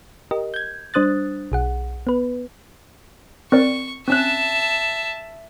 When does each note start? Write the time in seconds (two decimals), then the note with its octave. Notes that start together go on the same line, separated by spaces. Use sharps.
0.31 G4 A#4 D#5
0.54 G6 G#6
0.94 G3 D4 C5 D#6 F#6 A6
1.52 B1 G#4 F#5
2.07 B3 B4
3.52 C4 A#4 D5 C#6
4.08 C4 C#4 E5 A5 F#6